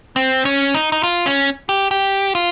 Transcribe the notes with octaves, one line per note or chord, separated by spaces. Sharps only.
C4
C#4
D#4
D#4
F4
C#4
G4
G4
F4